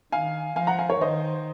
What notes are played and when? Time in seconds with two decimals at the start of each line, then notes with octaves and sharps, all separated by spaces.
0.12 D#3 F5 G#5
0.56 F3 F5 G#5
0.67 F#5 A#5
0.79 F5 G#5
0.89 A#4 C#5
1.01 D#3 C5 D#5